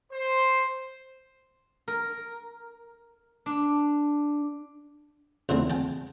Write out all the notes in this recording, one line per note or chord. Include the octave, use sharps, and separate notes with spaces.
C5
A#4
D4
E2 D3 A3 C4
G5 A5